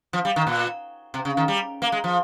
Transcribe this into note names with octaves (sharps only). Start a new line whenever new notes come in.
F3
G3
D#3
A#2
C3
C#3
D#3
G3
A#3
G#3
F3